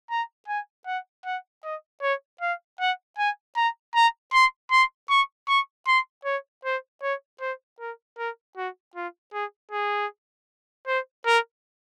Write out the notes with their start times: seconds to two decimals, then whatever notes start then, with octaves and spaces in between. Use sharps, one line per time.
0.10 A#5
0.48 G#5
0.86 F#5
1.25 F#5
1.64 D#5
2.02 C#5
2.41 F5
2.80 F#5
3.18 G#5
3.56 A#5
3.95 A#5
4.34 C6
4.71 C6
5.10 C#6
5.48 C#6
5.87 C6
6.25 C#5
6.65 C5
7.02 C#5
7.40 C5
7.80 A#4
8.18 A#4
8.57 F#4
8.96 F4
9.33 G#4
9.72 G#4
10.87 C5
11.26 A#4